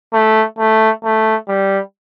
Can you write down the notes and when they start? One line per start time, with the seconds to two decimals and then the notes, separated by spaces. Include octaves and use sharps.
0.13 A3
0.59 A3
1.04 A3
1.48 G3